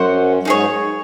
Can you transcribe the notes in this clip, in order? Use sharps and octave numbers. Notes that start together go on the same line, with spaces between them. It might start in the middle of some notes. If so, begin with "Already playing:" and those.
Already playing: F#2 F#4 C5 F#5
G#2 D#4 G#4 C#5